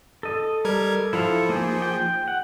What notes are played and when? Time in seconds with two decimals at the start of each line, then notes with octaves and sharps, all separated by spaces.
0.23 A4 D#5
0.65 G3 A#4 G#6
1.13 F3 E4 A4 F5
1.49 A#3 D#4 G#4
1.82 G5
2.28 F#5